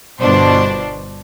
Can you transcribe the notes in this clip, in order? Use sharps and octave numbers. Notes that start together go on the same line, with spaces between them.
G1 B2 D4 C5